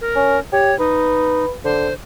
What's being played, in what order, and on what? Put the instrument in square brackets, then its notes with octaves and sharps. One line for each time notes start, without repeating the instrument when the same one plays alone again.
[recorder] A#4
[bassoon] C#4
[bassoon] G4 [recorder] C#5
[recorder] D#4 [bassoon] B4
[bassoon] D3 [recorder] C5